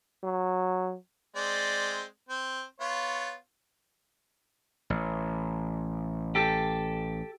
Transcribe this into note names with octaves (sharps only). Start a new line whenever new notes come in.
F#3
G#3 C4 D5
C4
B3 F4 C#5
A1
G4 A4